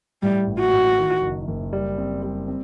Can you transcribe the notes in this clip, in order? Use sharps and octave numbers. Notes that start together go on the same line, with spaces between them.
A2 G3
A1
F#4
A2
D#3
F#1
F#1
G3
C4
G3
C4